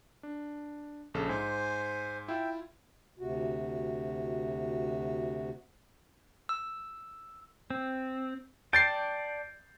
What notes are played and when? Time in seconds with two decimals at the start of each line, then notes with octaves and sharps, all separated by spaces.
0.23 D4
1.14 A#1 C#3 A4
1.29 G#2 C5 G#5
2.28 E4 F4 E5 G5
3.19 D2 C3 F#4
6.49 E6
7.70 C4
8.73 D5 G5 A5 G6 A6 C7